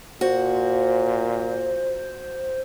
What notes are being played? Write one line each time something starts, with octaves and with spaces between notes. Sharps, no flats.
A#2 F#4 C5